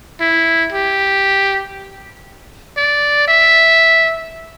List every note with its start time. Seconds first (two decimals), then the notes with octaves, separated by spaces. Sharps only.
0.21 E4
0.72 G4
2.77 D5
3.28 E5